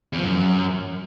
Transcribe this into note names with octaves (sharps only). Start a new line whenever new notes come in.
E2
F3
F#2